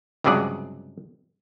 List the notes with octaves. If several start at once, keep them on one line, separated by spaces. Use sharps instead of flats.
C#2 G2 C3 F#3 G#4 D5